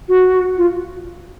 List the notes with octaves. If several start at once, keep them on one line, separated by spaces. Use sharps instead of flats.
F#4
F4